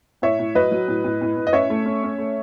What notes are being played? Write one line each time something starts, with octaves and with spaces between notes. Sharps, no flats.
A2 C#5 E5
A2
F#3 B4 D#5
F#3
A2
A2
A2
A2
D#5
C#4 C#5 E5
A3
C#4
C#4
A3